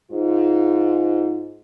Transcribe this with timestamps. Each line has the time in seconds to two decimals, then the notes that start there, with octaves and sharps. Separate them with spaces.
0.12 G#2 F4